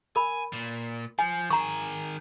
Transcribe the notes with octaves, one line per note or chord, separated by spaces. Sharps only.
A#4 G#5 B5
A#2
F3 G#5
D#3 G#4 A#5 C#6